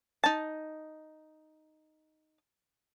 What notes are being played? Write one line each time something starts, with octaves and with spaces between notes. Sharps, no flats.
D#4 A5